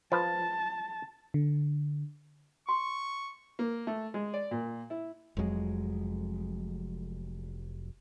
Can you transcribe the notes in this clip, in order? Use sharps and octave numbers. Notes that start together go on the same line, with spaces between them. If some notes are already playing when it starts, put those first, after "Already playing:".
F3 B4 A5
D3
C6 C#6
A#3
A3
G#3
D5
A#2
E4
F1 F2 F#3 G#3